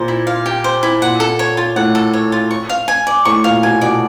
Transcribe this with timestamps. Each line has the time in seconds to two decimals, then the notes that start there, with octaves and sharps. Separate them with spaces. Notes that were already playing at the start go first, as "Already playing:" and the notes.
Already playing: A#2 C5
0.08 E4
0.27 F5
0.46 G4
0.64 C5
0.83 E4
1.02 A#2 F#5
1.20 A4
1.39 C#5
1.57 F4
1.76 A2 F#5
1.95 A4
2.13 C#5
2.32 F4
2.51 C#6
2.69 F5
2.88 G#5
3.07 D5
3.25 A2 C#6
3.44 A#2 F5
3.62 B2 G#5
3.81 B2 D5